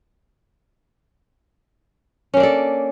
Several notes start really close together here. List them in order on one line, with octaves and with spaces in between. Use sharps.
C#4 A#3 D4 A4